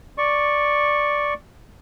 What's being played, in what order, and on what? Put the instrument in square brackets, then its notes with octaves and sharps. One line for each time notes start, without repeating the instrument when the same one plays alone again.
[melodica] D5 C#6